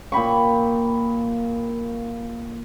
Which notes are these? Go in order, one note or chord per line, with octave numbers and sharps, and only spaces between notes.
A#2 G5 B5 C#6